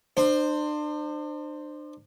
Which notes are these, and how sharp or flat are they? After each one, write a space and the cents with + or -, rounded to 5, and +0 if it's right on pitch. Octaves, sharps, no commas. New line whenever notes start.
D4 +40 C5 +0